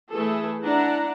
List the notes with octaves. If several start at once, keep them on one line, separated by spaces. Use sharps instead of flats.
E3 A3 G#4 A4
D4 E4 F#5 A#5